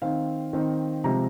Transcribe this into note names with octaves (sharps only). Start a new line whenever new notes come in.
D#3 C4 D#4 F5
D#3 C4 D#4
C3 F3 G#3 C4 A#5